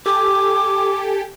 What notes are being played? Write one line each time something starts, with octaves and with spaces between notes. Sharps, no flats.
G4 A4 G#5 D6